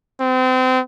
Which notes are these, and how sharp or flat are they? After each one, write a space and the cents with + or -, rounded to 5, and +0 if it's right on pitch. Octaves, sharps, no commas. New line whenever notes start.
C4 -30